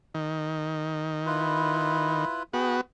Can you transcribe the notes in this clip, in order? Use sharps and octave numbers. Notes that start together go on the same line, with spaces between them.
D#3
E4 F4 B4
B3 F#4 G#4 G5